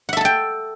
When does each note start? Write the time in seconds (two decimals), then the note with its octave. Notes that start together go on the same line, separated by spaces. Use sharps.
0.09 F#5
0.13 E5
0.17 A4
0.21 A5
0.25 G5